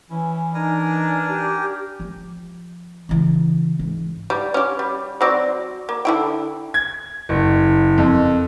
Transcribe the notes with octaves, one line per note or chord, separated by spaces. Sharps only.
E3 C#4 E4
D4 D#4 A#4 G#5 A#5
G4
F3
C#3 E3
G#2
G3
C#4 G4
G3
F#3 C4 D5
A#3
D3 E4 G5
G#6
F#1
F2